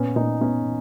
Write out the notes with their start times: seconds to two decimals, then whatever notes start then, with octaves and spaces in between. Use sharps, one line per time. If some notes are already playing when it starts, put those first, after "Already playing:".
Already playing: A#2 B3 C#4
0.16 A#2 C#4 D#4
0.41 B3 C#4 D#4